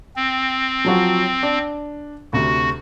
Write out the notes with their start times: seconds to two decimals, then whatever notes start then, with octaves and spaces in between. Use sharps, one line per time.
0.16 C4
0.85 F3 F#3 F#4
1.43 D4
2.33 D2 C3 F#4